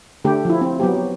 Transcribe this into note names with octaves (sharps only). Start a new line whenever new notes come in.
D3 A3 G4
F3 E4
C4
F#3 B3 G4